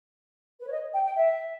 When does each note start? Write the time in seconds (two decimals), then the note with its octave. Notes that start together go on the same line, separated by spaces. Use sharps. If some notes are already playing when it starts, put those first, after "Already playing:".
0.60 B4
0.67 C#5
0.71 D#5
0.93 G5
1.05 G5
1.16 E5